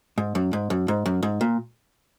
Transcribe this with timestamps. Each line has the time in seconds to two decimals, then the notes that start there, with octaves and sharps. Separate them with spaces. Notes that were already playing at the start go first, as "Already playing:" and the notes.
0.18 G#2
0.35 F#2
0.53 G#2
0.70 F#2
0.88 G#2
1.06 F#2
1.23 G#2
1.41 A#2